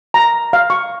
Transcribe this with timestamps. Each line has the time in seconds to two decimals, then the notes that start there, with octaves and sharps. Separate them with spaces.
0.14 A#5
0.53 F5
0.70 C#6